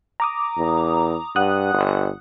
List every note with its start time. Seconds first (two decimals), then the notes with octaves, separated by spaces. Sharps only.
0.20 A#5 D6 D#6
0.58 E2
1.36 G2 F#5 D#6 F#6
1.74 G1